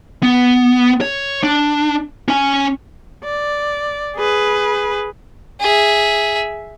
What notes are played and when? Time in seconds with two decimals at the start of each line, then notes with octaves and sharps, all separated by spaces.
0.23 B3
1.01 C#5
1.43 D4
2.28 C#4 G#5
3.24 D5
4.16 G#4 B4
5.60 G#4 E5